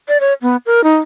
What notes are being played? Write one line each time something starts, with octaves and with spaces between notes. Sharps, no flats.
D5
C#5
B3
A#4
D#4